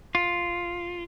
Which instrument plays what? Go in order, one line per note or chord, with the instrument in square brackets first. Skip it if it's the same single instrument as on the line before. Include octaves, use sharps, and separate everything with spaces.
[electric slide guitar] F4